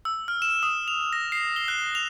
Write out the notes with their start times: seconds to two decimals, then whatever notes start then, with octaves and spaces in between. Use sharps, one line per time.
0.05 E6
0.28 F6
0.42 E7
0.63 D#6
0.88 F7
1.13 A#6
1.32 C7
1.56 G7
1.68 F#6
1.95 F7